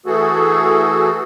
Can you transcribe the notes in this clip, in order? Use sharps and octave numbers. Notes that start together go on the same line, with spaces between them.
E3 A3 F#4 G#4 A4